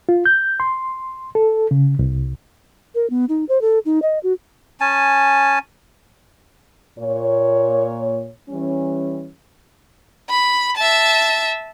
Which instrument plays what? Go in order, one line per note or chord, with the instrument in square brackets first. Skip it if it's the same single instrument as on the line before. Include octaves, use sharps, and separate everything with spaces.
[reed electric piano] F4
G6
C6
A4
C#3
C2
[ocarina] A#4
B3
D#4
C5
A4
D#4
D#5
F#4
[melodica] C#4 G#5 A5
[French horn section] A#2 C#5
E3 G3 C#4
[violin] B5
E5 A5